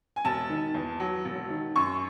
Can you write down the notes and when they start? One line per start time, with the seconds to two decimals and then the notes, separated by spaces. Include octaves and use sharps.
0.16 G#5
0.25 E1 A5
0.49 D#3
0.74 E2
1.00 F#3
1.25 E1
1.50 D#3
1.76 F#2 C#6